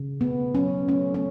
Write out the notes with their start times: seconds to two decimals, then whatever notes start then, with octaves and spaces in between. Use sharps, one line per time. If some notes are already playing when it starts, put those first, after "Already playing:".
Already playing: C#3
0.20 A3 B3
0.54 F#3 C#4
0.88 A3 C#4
1.14 C#4